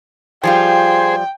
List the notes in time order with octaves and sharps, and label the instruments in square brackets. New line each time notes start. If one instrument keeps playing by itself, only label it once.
[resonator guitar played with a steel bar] F3 G3 F4 [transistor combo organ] G#4 C5 [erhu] G5